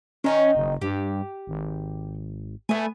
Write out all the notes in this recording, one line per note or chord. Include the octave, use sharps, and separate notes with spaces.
D#3 C#4 D#4 G5
F#1
G2 G4
G#1
A3 B3 G#5